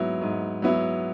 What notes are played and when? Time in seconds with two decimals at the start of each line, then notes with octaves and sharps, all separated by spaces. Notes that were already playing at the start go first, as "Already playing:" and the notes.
Already playing: G#2 F#3 B3 E4
0.22 G#2
0.62 F#3 B3 E4